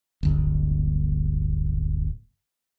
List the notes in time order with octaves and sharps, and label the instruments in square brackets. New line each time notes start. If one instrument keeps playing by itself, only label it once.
[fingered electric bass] D1 G1